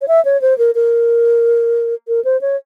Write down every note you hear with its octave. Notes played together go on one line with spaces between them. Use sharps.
C#5
E5
C#5
C5
A#4
A#4
A#4
C5
C#5